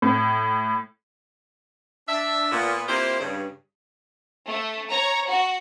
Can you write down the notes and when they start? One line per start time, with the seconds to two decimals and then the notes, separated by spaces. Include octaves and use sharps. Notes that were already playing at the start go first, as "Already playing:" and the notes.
0.02 A2
2.08 D4 E5
2.52 A#2 B3
2.87 A#3 C4 E4 F4 G4 C5
3.20 G2 C#3
4.46 A3
4.91 C#5 A#5
5.28 F#4